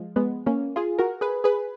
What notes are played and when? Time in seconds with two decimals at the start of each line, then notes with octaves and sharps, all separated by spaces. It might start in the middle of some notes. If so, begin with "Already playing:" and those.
Already playing: F3 G#3
0.16 G#3 B3
0.46 A#3 C#4
0.76 F4 G#4
0.99 F#4 A#4
1.21 G#4 B4
1.44 G#4 B4